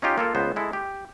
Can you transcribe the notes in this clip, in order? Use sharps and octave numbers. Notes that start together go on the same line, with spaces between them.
C#4 D#4 F4 G4
A#3 F4 A4
C#2 B3 C5
G#3 E4 A4
G4